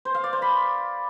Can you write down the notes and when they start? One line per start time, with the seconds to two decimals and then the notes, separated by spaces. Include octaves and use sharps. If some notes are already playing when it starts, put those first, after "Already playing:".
0.05 C5
0.14 F5
0.24 D5
0.33 C5
0.42 B5